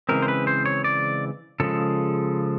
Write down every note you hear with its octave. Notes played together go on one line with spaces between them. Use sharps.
C#3 E3 G#3 C4 A#4
C5
B4
C5
C#5
D5
C#3 F3 G#3 A4